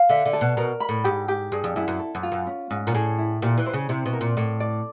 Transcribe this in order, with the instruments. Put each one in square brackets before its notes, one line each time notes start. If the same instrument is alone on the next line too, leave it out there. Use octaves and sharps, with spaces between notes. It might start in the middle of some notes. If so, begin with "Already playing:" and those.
Already playing: [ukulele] F5
[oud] D3 [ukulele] E5
[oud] D3
[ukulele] A4
[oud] B2
[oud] B2 [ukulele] A#4
[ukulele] B5
[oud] A2
[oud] G#2 [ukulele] G4
[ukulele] G4
[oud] G2 [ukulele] G#4
[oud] F2
[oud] F#2 [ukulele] E4
[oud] F#2
[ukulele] A4
[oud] F#2
[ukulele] F4
[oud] F#2
[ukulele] C#4
[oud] G#2 [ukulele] C#4
[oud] A#2
[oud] A2 [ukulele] G#4
[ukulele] E4
[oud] A#2 [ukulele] G4
[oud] E3
[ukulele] C5
[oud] C#3
[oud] C3 [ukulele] E4
[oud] B2
[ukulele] A#4
[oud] A#2
[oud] A2 [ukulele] D5
[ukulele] D5